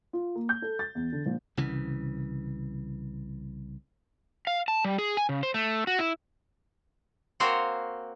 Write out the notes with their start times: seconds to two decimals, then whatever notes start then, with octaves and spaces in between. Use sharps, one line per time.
0.13 F4
0.35 A#3
0.49 G6
0.62 A4
0.79 A6
0.95 E2
1.12 D3
1.26 A#1
1.57 C2 C#3 E3
4.47 F5
4.68 A5
4.85 G3
4.98 G#4
5.17 G#5
5.29 C#3
5.43 C5
5.54 A3
5.87 F#4
5.99 E4
7.40 A#3 C4 F#4 A#4 C5 C#5